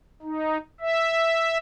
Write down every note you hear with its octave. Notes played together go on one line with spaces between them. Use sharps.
D#4
E5